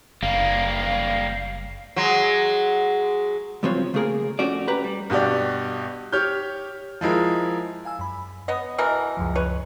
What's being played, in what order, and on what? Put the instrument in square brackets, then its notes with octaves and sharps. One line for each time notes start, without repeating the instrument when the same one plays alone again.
[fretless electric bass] F#1 [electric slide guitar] G3 A#3 [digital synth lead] F5
[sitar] F#3 G#3
[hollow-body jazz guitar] C#2 G2 F3 F#3 C4 C#5
C#3 A3 A#3 G#4 A#4
F2 A3 C#4 F#4 D5
G4 B4 A#5
G3
[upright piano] G2 B2 F#4 G4 D5
G4 C#5 F6 G6
F3 G#3 E4 A#4
[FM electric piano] F5 G#5 E6
F#2 B5
[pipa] B3 D#5 [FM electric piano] C#5
[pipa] B2 E3 A#4
[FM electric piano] C#2 F#2 F3
[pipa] B4 C#5